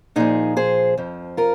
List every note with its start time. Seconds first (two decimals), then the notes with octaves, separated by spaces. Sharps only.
0.16 A#2 F3 D#4 G#4
0.57 G#4 C5
0.97 F2 F3
1.37 F4 A#4